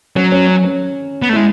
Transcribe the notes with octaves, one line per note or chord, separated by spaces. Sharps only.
F#3 C#4
C#4
C#4
C#4
B3
A3
G#3 E4